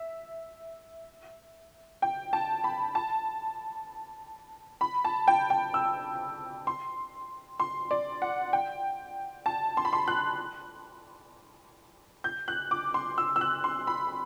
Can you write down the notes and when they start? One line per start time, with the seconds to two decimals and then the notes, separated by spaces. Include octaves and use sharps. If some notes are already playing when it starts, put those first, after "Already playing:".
Already playing: E5
2.02 G5
2.33 A5
2.64 B5
2.95 A5
4.81 B5
5.05 A5
5.28 G5
5.50 G5
5.74 E6
6.67 C6
7.60 C6
7.91 D5
8.22 F#5
8.53 G5
9.46 A5
9.77 C6
9.85 B5
9.93 C6
10.08 F#6
12.24 G6
12.48 F#6
12.71 D6
12.94 C6
13.18 E6
13.36 E6
13.41 F#6
13.64 C6
13.87 B5